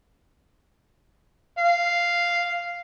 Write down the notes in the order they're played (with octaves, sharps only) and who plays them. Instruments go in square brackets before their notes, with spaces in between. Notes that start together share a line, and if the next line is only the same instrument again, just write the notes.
[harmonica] F5